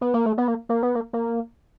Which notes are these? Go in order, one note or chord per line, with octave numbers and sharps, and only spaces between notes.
B3
A#3
A3
B3
A#3
A#3
B3
A#3
A#3